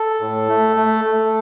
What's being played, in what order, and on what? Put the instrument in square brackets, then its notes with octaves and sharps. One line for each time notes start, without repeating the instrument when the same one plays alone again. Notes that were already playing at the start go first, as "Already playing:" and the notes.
Already playing: [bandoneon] A4
A2
A3
A3
A3